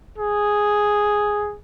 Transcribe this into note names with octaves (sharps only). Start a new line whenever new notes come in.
G#4